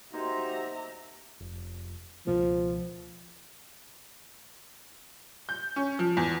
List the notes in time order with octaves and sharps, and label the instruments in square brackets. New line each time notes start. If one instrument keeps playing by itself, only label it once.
[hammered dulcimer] A#3 C5 D#5 [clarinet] D#4 [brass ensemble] F#4 G4 [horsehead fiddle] E5 A#5
[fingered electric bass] F1
[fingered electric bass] C#2 B2 A#3 [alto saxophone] F3
[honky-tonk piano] G6
C#4
F3
E2